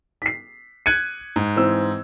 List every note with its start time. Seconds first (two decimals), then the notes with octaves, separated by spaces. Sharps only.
0.22 B6 C7
0.86 F#6 G#6 C#7 D#7
1.36 G#2
1.56 E3 C4 E6